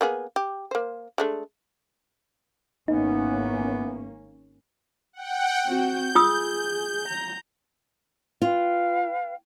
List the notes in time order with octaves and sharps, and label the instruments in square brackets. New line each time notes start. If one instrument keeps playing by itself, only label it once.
[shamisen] A#3 B3 G#4
G4
A#3 C5
G#3 A3 D4
[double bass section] G#1 A#3 C#4 [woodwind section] C#3 E3 B3 [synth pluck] D#4
[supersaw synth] F#5 G5
[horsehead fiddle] C4 F#4 [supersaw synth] G6
[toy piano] F4 D#6 E6 [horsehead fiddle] G#4
[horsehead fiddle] A#5
[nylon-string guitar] F4 [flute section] B4 F5 G5